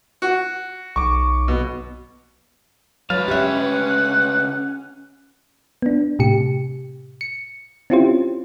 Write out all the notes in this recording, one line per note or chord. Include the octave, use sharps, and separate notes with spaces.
F#4
B1 C#6 D6
B2
C#2 F#3 B4 F5 A5
C#4 G4 E5 F#5
B3 D4
A2 C3 G4 C#7
C#7
C4 C#4 E4 F4 G4 C5